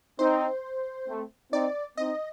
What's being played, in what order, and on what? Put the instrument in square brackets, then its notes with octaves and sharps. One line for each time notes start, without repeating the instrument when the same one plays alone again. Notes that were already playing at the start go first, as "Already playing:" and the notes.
[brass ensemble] C4 D#4 [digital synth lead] C5
[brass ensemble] A3 C4
[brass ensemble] C4 D#4 [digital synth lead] D5
[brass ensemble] C4 D#4 [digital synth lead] D#5